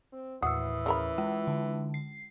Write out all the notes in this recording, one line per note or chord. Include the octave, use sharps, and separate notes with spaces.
C4
D#2 A2 E3 F#4 D#6 E6
C#3 A#4 B5
G#3
D3
C7